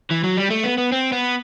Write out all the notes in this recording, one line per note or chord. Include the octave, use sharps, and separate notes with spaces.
E3
F#3
G3
A3
B3
B3
C4
B3